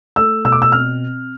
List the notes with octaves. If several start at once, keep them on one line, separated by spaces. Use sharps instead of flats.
A3 E6
B2 E6
D6
E6
C4 F6